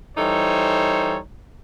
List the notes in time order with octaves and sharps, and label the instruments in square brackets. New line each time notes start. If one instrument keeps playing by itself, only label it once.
[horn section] E3 G3 D#4 A4 C5 C#5